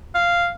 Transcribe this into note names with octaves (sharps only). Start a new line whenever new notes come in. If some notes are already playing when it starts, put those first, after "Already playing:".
F5